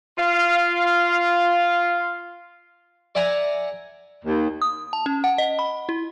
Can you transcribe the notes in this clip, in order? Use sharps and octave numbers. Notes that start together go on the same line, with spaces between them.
F4 F5
D5 E5 F#5 G#5 A#5
D#2
D#6
A5
C#4
F#5
D#5
B5
E4